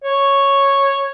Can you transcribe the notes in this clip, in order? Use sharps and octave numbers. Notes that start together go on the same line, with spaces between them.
C#5